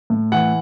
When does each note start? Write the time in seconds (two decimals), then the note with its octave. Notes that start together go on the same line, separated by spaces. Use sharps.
0.10 A2
0.32 E3 F#5